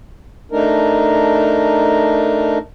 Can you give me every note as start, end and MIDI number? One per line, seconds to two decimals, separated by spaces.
0.52 2.58 57
0.52 2.58 62
0.52 2.58 63
0.52 2.58 70